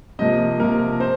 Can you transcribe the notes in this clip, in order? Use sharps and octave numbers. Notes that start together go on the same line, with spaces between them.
C3 F3 A#3 D#5
C3 F3 A#3 A#4
C4 C5